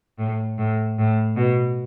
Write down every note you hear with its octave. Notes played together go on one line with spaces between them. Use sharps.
A2
A2
A2
B2